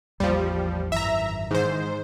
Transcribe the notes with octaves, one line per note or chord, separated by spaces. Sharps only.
A1 E2 F3 G3 A#3
G#1 F#2 E3 E5 A#5
G#2 D#3 E3 C5